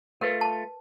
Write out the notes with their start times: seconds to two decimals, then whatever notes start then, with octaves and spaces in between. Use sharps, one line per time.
0.21 A3 F4 A#4 B4
0.41 A5